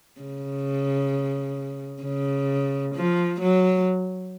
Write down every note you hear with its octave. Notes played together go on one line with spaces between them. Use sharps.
C#3
C#3
F3
F#3